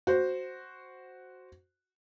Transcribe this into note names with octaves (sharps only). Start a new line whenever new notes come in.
F#4 C5